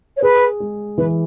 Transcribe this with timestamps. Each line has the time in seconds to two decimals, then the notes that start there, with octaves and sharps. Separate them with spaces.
0.17 C#5
0.22 G#4 B4
0.60 G#3
0.98 E3 B4